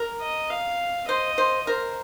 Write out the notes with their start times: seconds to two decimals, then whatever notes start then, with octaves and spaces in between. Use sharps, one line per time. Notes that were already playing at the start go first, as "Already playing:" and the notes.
Already playing: A#4
0.21 D#5
0.50 F5
1.09 C5 D#5
1.38 C5
1.67 A#4 C5